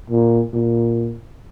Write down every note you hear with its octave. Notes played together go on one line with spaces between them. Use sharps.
A#2
A#2